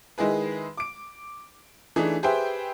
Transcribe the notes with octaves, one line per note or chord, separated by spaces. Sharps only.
D#3 G#3 E4 G#4 B4
D6 D7
E3 A3 D4 D#4 G#4
G4 G#4 B4 C5 E5 G5